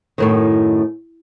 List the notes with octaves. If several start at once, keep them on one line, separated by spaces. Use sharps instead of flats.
F#2 A2 D#3